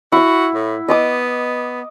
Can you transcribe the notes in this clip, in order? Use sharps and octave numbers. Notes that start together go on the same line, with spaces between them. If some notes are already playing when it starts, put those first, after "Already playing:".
E4 F#4 F#5
A2
B3 D#5 D6 D#6